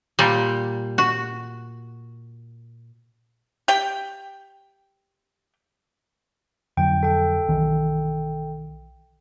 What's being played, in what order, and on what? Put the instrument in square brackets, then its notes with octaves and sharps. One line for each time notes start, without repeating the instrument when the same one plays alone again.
[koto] A#2 G3
F#4
[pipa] G4 G5
[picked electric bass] F2 D3 F#3 [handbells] G5
[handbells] A4 G5
[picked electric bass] B1 D#3 E3